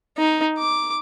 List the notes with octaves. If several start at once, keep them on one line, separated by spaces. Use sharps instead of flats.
D#4
D6